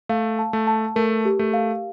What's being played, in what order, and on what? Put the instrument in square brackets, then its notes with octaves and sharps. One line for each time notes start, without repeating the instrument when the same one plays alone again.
[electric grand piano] A3 [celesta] F5
[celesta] A5
[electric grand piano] A3
[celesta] A5
[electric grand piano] A3 [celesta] A#4
[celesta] G4
[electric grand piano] A3
[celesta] F5